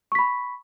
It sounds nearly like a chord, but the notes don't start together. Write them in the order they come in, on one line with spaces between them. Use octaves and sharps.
C#6 B6 B5